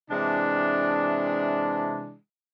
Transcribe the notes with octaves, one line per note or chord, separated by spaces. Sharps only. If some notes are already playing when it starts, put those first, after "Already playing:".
C3 E3 G#3 D4